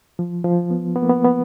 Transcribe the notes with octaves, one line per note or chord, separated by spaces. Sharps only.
F3
F3
B3
B3
A#3
B3
B3